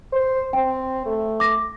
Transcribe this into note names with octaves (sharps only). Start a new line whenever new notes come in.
C5
C4 G5
A3
D6 A#6